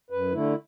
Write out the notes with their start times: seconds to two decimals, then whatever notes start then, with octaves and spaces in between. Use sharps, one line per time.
0.10 F#2 B4
0.32 D3 A3 E4